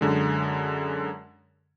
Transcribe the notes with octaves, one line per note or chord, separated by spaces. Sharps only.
F#2 D3 G#3